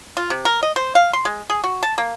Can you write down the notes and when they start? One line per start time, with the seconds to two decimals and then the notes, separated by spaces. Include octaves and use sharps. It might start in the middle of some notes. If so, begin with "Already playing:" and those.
0.17 F4
0.30 C3
0.45 A#4
0.63 D#5
0.76 C5
0.95 F5
1.13 C6
1.25 G#3
1.50 G#4
1.64 F#4
1.83 A5
1.98 A#3